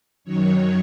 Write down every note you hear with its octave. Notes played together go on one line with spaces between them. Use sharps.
F#2 D#3 F#3 C#5